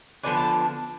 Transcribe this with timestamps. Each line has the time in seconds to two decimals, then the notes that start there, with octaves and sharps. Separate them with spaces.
0.23 D3 F3 B3 D4 G#5
0.37 A5